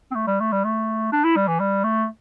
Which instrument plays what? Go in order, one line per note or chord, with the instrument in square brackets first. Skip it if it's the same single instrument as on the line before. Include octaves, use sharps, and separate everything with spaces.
[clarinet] C4
A3
G3
A3
G3
A3
D4
E4
G3
E3
G3
A3